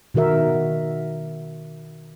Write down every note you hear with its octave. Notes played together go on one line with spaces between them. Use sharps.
B2 D#3 F#4 A#4 E5